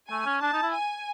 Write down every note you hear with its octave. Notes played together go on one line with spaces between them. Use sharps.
A3 G#5
C#4
D4 A5
D#4
E4
G#5